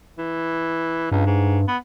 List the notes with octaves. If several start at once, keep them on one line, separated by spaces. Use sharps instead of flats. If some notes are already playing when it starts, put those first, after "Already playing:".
E3
C#2 G2
G#2
B3